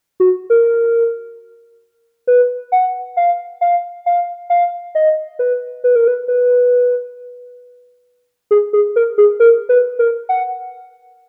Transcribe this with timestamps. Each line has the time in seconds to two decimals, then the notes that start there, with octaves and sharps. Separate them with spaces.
0.20 F#4
0.50 A#4
2.27 B4
2.72 F#5
3.17 F5
3.61 F5
4.06 F5
4.50 F5
4.95 D#5
5.39 B4
5.84 B4
5.96 A#4
6.08 B4
6.28 B4
8.51 G#4
8.73 G#4
8.96 A#4
9.18 G#4
9.40 A#4
9.69 B4
9.99 A#4
10.29 F#5